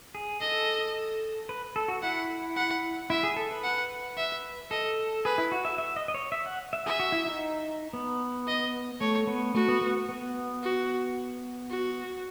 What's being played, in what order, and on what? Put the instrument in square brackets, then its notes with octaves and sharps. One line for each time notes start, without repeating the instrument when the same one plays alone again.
[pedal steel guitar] G#4
[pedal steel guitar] A4 [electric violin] D#5
[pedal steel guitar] B4
A4
F#4
[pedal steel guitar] E4 [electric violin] F#5
[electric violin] F#5
[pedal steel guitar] E4 [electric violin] E5
[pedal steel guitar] G#4
A4
B4
[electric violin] F#5
E5
[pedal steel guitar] A4 [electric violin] D#5
[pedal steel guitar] G#4 [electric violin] B4
[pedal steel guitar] E4
F#4
E5
E5
D#5
D#5
C#5
E5
F#5
E5
[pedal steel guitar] G#4 [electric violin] E5
[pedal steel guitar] F#4
E4
D#4
B3
[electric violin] D#5
[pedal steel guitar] A3 [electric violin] C#5
[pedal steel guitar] B3
[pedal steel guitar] A3 [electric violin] F#4
[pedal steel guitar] B3
B3
B3
[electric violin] F#4
F#4